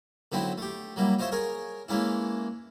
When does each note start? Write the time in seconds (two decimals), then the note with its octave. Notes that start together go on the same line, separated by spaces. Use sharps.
0.32 D3 F#3 B3 C4 D#4 E4
0.58 A3 G4
0.96 F#3 G3 A#3 E4
1.19 D#4 F4 C5 C#5 E5
1.32 G#4 A#4 C#5
1.88 E3 G#3 A#3 C#4 E4